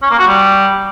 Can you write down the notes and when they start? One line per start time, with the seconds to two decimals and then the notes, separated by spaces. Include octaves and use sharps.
0.02 C#4
0.11 A#3
0.19 F#4
0.27 G3